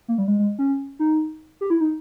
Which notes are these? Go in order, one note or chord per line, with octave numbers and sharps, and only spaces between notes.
A#3
G3
G#3
G#3
C#4
D#4
G4
E4
D#4